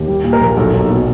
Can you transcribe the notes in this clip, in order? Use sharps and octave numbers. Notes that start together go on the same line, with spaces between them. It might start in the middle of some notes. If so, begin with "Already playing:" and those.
Already playing: D#2
G3
A#2
A#4
A#1
B1 A4
B1
B2